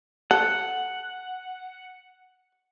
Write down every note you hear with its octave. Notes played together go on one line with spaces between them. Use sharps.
A4 F#5